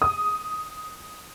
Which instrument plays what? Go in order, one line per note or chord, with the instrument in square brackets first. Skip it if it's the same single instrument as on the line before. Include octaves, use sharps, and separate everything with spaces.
[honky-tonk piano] D#6